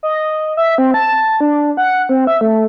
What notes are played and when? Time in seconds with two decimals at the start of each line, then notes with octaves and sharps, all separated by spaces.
0.03 D#5
0.57 E5
0.78 C4
0.94 A5
1.41 D4
1.77 F#5
2.09 C4
2.27 E5
2.41 A3